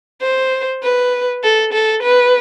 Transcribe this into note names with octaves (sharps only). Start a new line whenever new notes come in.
C5
B4
A4
A4
B4